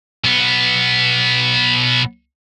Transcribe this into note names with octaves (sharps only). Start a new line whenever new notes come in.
B1 B3